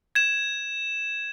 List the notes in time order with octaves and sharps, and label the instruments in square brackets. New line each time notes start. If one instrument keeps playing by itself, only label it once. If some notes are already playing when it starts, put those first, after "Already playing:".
[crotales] G#6 E7